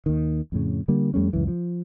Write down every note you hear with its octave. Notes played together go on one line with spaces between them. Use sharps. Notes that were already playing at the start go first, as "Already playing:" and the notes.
D#2 D#3
F2 A2 C#3
D3 G3 A#3
F2 G3 A3 C#4
C#2 F#2 E3
F3